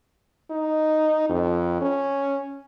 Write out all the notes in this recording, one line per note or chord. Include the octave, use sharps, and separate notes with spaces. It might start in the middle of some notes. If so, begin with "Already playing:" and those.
D#4
F2
C#4